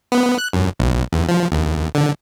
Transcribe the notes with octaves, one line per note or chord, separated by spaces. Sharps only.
B3
F#6
F#2
B1
E2
F3
D#2
D3